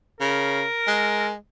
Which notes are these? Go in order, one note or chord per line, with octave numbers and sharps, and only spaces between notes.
C#3 A#4
G#3